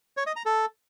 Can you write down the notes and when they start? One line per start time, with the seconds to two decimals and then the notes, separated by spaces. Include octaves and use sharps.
0.17 C#5
0.27 D#5
0.36 A#5
0.46 A4